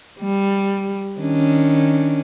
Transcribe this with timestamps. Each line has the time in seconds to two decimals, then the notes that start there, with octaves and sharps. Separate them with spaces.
0.21 G3
1.20 D#3 C#4 D4